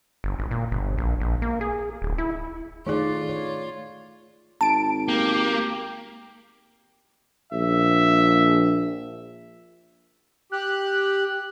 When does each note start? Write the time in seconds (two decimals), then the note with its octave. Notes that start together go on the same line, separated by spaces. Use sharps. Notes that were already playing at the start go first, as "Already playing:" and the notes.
0.24 G1
0.39 G#1
0.51 A#2
0.71 G1
0.98 A#1
1.20 A#1
1.42 A#3
1.61 G#4
2.02 D1
2.18 E4
2.87 D#3 A3 D#4 F4 G#4 D5
3.29 C#5
4.61 G#1 A5 D7
5.08 A#3 G4
7.52 A#1 E5
10.52 G4 F#6